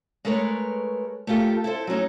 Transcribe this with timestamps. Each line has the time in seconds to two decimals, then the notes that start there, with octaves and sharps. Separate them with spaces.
0.25 G#3 A3 A#4 B4 C#5
1.27 A3 A#3 F4 G4 A4
1.64 E4 A4 C5
1.87 F#3 A3 C#4 D#4